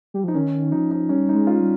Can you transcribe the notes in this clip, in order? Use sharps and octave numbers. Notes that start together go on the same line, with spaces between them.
G3
F3 D#4
D#3 C#4
F3 D#4
D#4
G3 C#4
D#4
G#3
F4
G3